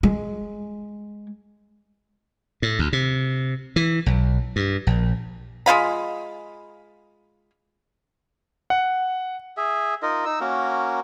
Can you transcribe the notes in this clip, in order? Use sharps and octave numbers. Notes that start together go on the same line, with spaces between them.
G#3
A2
D2
C3
E3
B1
G2
A#1
G#3 F4 F5 B5
F#5
G#4 E5
D#4 F4 A#4 D#5
D#4 E6
A#3 C#4 F#4 A#4